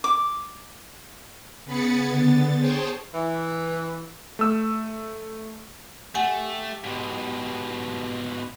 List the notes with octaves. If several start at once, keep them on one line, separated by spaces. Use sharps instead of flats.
D6
C#3 B3 G#4 B5 A6 C#7
D3 B3 A6
G#4 C5 C#5 G5 A5
E3
A3 E6
A3 G4 F#5 G#5
G#2 B2